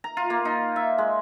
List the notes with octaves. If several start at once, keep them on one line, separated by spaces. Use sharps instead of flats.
A#5
F4
A#3
D#4
E5
G#3